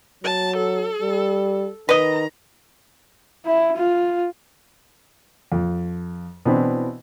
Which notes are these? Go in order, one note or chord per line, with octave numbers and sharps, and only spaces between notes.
F#3 A5
A4
G3
D#3 B4 D#5 A#5
E4
F4
F2
B2 E3 C4 D4 E4